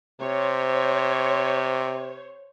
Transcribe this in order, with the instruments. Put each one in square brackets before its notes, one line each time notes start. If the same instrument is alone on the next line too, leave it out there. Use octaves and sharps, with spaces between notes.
[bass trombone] C3 [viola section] C5 C#5